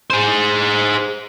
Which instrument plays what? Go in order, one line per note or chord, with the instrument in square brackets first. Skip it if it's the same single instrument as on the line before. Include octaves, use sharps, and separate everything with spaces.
[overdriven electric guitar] G#4 C5